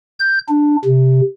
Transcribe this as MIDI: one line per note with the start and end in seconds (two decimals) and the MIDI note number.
0.20 0.39 91
0.49 0.76 62
0.85 1.21 48